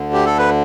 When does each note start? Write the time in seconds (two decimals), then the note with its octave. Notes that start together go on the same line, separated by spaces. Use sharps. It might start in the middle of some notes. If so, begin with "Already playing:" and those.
Already playing: D2 D3
0.13 G4
0.26 A4
0.38 B4